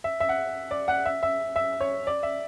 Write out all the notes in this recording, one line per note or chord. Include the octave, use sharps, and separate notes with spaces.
E5
E5
F#5
D5
F#5
E5
E5
E5
C#5
D5
E5